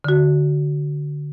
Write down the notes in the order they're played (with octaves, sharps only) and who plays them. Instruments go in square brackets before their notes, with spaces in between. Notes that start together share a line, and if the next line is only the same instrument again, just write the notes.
[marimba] D3 F#4